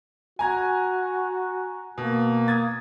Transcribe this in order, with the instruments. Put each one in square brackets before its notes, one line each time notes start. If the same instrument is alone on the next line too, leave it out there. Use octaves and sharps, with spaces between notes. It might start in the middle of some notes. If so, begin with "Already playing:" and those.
[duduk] F#4 [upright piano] G#5 A#5 G#6
[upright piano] B2 [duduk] A#3
[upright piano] D#6 G#6 A6